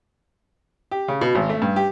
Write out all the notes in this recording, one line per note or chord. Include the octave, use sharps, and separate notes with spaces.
G4
C#3
B2
G#1
A3
G2
G4